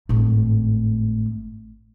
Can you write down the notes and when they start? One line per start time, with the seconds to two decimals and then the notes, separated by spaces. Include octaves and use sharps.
0.09 G#1 A2